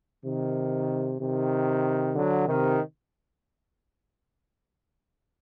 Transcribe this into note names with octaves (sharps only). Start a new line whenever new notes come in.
C3 D#3
C3 D#3
D3 F#3
C3 D#3